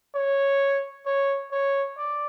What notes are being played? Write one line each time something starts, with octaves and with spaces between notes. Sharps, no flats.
C#5
C#5
C#5
D5